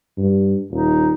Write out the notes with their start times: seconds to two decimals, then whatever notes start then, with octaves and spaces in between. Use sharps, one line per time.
0.18 G2
0.70 D#1 D#4